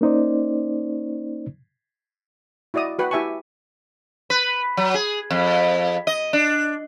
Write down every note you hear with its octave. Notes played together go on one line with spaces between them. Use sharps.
A#3 C#4 D#4 C5 D5
E4 F#4 D5 D#5 D#6
F#4 B4 F#5 G5
E4 G4 E5 G#5 A5 C#6
B4
F#3
G#4
F2
D#5
D4